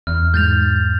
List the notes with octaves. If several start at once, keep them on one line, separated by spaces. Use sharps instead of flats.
E2 F6
G#2 G6 A6 F7